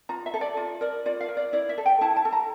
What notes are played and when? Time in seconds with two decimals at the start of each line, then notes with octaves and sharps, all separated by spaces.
0.09 F4 A#5
0.26 E5
0.34 A4
0.41 D5
0.57 F4
0.81 A#4 D5
1.06 F4 D5
1.21 F5
1.29 A#4
1.37 D5
1.53 E4 D5
1.69 E5
1.78 A4
1.86 G5
2.01 E4 A5
2.16 A5
2.25 A4
2.32 A#5